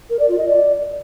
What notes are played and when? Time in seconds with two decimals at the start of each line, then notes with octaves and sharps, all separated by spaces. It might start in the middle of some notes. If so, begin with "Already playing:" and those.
0.10 A#4
0.19 D5
0.28 F4
0.38 D#5
0.47 D5